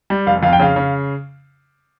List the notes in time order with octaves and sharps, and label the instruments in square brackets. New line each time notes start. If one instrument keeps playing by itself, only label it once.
[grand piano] G3
F1 F5
F2 F5
G5
C#3 F5
C#3